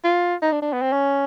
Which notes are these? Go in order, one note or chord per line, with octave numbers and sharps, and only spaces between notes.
F4
D#4
D4
D4
B3
C4
C#4